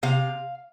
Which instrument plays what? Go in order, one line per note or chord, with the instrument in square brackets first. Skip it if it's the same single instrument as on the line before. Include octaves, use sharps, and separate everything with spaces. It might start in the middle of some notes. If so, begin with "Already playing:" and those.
[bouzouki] C3 F5